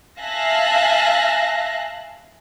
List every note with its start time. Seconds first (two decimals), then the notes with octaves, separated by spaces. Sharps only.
0.20 E5 F5 G#5 A5 F#6 A#6